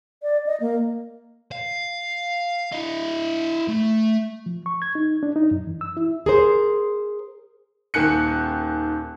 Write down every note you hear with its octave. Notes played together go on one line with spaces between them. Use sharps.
D5
D#5
A#3
F5
E4 D#5
A3
F3
C#6
G#6
D#4
D4
D#4
F#2
E3
E6
E4
G#4 A#4 C5
D#1 D#3 G#5 F#6 C#7